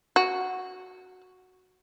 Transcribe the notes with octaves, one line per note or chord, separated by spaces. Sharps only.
F#4